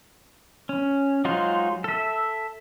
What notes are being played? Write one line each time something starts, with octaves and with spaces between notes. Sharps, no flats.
C#4
F#3 G#3 D#4 F4 C5
A4 E5